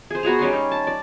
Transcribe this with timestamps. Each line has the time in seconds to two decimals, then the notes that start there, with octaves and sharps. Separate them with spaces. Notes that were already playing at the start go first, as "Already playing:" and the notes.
0.10 G#4 C5
0.23 B3 F#4 G#4 A#5
0.39 G3 C#4 D#4 C6
0.53 D#4
0.71 A5
0.87 D5